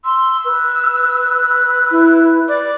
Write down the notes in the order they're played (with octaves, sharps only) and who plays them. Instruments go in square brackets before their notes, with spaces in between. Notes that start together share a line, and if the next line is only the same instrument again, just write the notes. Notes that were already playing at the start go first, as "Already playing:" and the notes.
[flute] C6 [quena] E6
[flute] B4
[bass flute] E4
[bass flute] D5 [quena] D6